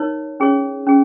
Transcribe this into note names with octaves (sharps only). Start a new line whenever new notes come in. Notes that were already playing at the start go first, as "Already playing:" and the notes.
Already playing: D#4 A#4 C#5
C#4 G#4 C#5
C#4 G#4